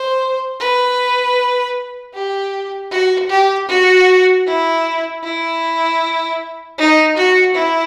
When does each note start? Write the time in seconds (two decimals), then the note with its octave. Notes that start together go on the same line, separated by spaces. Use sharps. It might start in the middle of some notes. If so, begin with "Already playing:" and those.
Already playing: C5
0.60 B4
2.14 G4
2.91 F#4
3.29 G4
3.68 F#4
4.46 E4
5.23 E4
6.78 D#4
7.17 F#4
7.55 E4